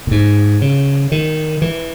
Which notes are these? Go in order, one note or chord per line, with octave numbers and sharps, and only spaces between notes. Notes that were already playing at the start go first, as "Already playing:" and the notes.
A#2
G#2
C#3
D#3
E3